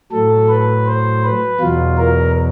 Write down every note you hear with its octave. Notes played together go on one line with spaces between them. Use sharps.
A2 F#3 A4
B4
C5
B4
E2 B2 F#3 F4
A#4